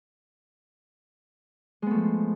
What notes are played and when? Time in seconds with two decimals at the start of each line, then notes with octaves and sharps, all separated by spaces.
1.82 G#3
1.86 B3
1.90 A3
1.95 F3